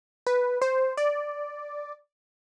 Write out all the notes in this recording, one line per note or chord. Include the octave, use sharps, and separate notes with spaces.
B4
C5
D5